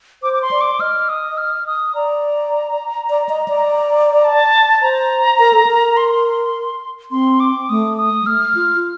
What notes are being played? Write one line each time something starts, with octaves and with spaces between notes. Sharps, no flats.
C5 D6
D6
C6
D5
D6
D#5 F6
D#6
F6
D#6
D5 A#5
D5
D#5
D5
A5
C5 A#5
A#4
A4
A#4
C6
C4 C6
D6
A3 D#6
D#6
G3
A3 F6
F4